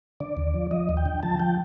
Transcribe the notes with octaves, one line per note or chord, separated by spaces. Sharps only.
D3 D5
D#2
F3
F3 D#5
D#2
G5
D3
F3 A5
F3 G5